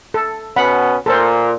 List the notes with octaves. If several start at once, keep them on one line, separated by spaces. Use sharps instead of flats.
A4
B2 B3 C#4 F#5 B5
A#2 A4 A#4 C5